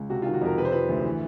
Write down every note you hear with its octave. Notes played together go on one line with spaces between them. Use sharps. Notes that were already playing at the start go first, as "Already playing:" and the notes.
Already playing: C#2
C3 F#4
F4
D#3
F#4
F2 A#4
C3 B4
C5
F3 B4
D2
E3